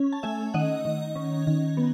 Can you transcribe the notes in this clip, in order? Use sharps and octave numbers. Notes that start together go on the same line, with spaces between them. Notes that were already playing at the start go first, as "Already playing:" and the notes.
Already playing: C#4
A5
A3 E5 G#5
D#3 D#5 F#5
D#3
C#4
D#3
B3